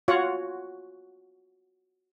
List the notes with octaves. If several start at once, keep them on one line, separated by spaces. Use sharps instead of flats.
F4 F#4 C#5 F#5